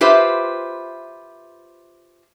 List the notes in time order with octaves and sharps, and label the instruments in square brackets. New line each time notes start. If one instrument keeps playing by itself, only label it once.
[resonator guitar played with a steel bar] F4 G4 B4 C5 E5